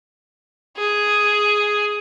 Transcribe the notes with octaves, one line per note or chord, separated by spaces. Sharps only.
G#4